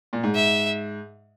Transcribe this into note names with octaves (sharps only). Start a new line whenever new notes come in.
A#2
G#2
E5